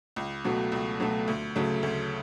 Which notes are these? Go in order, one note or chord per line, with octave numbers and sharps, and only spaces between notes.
C#2
B2 F#3 A3
C#2
B2 F#3 A3
D2
C#3 F#3 A3
D2